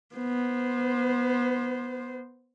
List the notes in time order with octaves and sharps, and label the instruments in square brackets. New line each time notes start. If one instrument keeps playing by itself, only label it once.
[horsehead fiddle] B3 C5